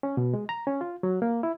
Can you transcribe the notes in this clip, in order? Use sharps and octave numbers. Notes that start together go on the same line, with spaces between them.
C#4
B2
G#3
A#5
C#4
F4
F#3
A#3
E4